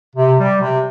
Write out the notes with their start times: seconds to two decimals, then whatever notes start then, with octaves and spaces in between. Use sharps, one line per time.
0.15 C3
0.39 G3
0.61 C3